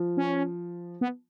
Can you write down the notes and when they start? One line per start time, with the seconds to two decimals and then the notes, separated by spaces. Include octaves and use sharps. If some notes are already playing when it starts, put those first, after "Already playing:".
Already playing: F3
0.17 C#4
1.01 B3